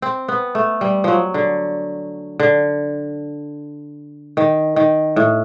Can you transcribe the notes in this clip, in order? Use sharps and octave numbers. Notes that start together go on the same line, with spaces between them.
C4
B3
A3
G3
F3 F#3
D3
D3
D#3
D#3
A2